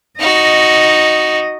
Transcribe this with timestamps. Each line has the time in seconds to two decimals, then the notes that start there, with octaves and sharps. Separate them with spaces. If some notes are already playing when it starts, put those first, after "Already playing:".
0.20 D#4 F#4 D#5